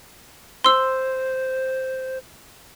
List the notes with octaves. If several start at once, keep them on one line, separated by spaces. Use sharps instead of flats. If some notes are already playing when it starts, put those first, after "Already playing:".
C5 C6 E6